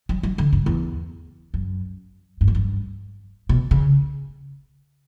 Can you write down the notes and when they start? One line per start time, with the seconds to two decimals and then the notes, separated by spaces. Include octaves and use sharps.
0.09 F#3
0.23 F#3
0.38 D3
0.53 G2
0.66 E2
1.54 F#2
2.41 G2
2.48 F#2
2.55 G2
3.49 B2
3.71 C#3